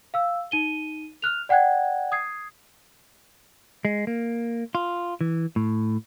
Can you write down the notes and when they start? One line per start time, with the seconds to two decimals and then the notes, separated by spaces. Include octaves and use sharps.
0.14 F5 E6
0.51 D#4 D#7 G7
1.22 F6 F#6 F7
1.49 D5 F#5 G5 F#6 G#6
2.12 D#6 G#6 C7
3.85 G#3
4.07 A#3
4.75 F4
5.21 E3
5.56 A2